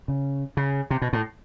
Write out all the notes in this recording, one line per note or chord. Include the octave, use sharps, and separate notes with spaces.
C#3
C#3
C3
B2
A2